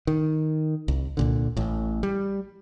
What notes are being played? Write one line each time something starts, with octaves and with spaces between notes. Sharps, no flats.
D#3
C2
C2 A#2 D3
A1 A2
G3